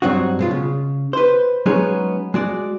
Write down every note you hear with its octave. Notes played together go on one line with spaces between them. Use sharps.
G2 F#3 C4 D#4 F#4
B2 G#3 F4
C#3
B4 C5
F#3 G#3 B3 C#4 D#4 G#4
G#3 F#4 D5